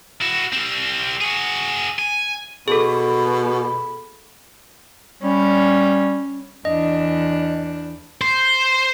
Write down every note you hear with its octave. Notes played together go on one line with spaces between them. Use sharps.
E4 F#4
G3 C4
F#4 G#4
G#5
B2 G#4 A4 B5
G3 C#4
E2 D4 D#5
C5